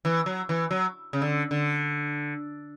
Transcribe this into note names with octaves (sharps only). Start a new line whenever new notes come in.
E3
F#3
E3
F#3
C#3
D3
D3